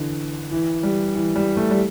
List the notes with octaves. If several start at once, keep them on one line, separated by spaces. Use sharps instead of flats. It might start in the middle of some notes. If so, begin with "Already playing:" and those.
Already playing: D3 E3
E3
G3
E3
G3
A3
G3